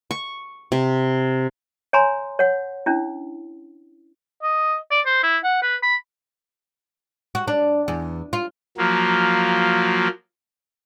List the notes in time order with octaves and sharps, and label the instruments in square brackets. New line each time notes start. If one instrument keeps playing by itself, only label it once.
[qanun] C#6
C3
[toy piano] C#5 G#5 A#5 C6
C#5 F#5
C#4 D4 E4
[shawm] D#5
D5
C5
E4
F#5
B4
B5
[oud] F#4
D4
E2
F4
[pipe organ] F3 F#3 A#3